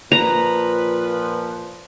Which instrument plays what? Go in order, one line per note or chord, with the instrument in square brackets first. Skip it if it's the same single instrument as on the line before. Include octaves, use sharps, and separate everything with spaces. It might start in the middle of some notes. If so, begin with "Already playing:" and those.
[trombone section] A#2 F3 [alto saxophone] B4 [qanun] A#5